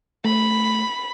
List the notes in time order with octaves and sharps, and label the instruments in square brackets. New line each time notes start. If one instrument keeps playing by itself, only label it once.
[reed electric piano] A3 [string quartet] B5